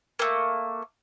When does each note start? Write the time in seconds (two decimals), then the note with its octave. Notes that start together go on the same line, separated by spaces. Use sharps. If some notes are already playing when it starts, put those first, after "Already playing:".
0.19 A3 A#3